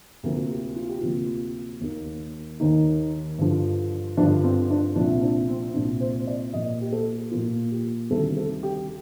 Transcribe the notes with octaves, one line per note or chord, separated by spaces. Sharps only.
D2 C3 F3 A#3 A#4
G4
F4
G4
D2 C3 F3 A#3 F4
D#2 D#3 A#3
D#2 D#3 A#3 D#4
G2 D3 F3
G2 D3 F3 D4
C4
D4
C2 A#2 F3 D4
D4
C4
C2 A#2 F3 D4
C5
D5
A#2 F3 A#3 D#5
G4
A4
A#2 F3 A#3 F4
G4
D2 C3 D#3 G3 A4
A4
G4